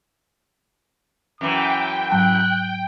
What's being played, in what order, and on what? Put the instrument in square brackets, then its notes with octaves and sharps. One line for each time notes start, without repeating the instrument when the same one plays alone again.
[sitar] F#2 E3 [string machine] G5 [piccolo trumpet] D6
[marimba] G#2 F#3 A5 [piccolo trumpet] F#6